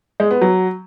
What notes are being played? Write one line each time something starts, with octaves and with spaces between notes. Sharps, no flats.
G#3
B3
F#3